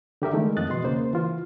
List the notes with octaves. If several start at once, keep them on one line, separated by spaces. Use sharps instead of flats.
D3 G4 A#4 E5
D#3 G#3 A3
F2 D#5 F#6 A6
E2 B2 D#5 C6
C#3 A#3 C5
E3 F4